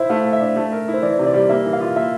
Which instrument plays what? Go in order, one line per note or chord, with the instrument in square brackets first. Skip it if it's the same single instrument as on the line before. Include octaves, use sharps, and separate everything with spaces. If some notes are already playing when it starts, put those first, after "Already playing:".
Already playing: [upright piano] E4 [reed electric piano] C5 E5
[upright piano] A3 [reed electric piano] F5
[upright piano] A4
[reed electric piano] E5
[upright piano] D4
A3
A#4
E4
[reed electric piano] C5
[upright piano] E3 [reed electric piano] D5
[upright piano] C3
[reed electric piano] D5
[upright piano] G3
[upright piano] A#3 [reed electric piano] E5
[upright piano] E3
[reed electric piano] F5
[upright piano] F4
[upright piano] A#3 [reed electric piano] E5